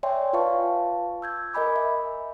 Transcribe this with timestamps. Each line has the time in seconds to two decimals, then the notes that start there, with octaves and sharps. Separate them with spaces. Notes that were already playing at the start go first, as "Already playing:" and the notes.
0.03 C#5 D5 E5 G5 G#5 C6
0.33 F4 B4 F5 A5 C#6
1.22 E6 G6 G#6
1.54 A#4 D#5 G#5 B5 D6
1.76 E5